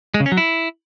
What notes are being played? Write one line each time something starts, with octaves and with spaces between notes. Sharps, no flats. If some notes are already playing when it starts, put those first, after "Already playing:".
G#3
C#3
C#4
F#3
E4